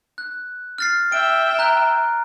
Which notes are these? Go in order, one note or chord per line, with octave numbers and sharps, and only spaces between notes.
F#6
F6 A6 C7
E5 G5 D7
A#5 F#6